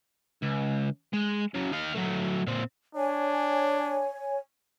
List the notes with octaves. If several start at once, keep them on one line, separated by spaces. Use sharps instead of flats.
C#2
G#3
C#3 F#3
D#4 F5
F#3 A3
A#2 C4
D4 C#5 G#5